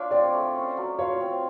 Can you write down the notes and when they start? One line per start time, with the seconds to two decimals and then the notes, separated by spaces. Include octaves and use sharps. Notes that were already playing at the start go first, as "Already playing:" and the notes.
Already playing: D4 F4 C#5
0.11 C4 D5
0.33 A3
0.55 C#4
0.77 F#3
0.99 F4 C#5
1.21 C4